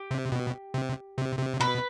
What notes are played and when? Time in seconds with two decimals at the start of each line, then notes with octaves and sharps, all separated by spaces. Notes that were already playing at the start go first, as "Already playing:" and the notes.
Already playing: G4
0.11 C3
0.32 B2
0.74 C3
1.18 C3
1.39 C3
1.60 B2 B4